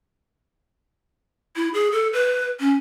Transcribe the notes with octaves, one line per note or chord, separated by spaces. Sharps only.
E4
G#4
A4
B4
C#4